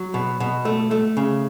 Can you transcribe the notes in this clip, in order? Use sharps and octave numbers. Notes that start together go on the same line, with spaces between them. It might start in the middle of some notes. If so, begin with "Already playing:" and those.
Already playing: F#3
B2
B2
A3
A3
C#3